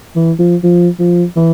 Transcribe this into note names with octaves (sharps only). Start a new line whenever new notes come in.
E3
F3
F3
F3
E3